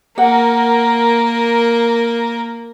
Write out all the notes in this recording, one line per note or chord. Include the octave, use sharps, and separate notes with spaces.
A#3 A#4 F#5